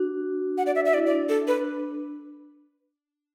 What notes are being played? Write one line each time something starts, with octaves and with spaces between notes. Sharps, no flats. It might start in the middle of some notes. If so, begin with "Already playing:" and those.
Already playing: D4 F#4
F#5
D5
E5
E5
E4 D5
D5
D4
A4
B4